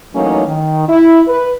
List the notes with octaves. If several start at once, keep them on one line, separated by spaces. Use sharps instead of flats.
E3 F#3 A3 A#3 C#4 D#4
D#3
E4
B4